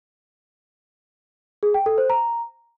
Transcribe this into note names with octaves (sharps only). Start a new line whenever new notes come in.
G#4
G5
A4
C5
A#5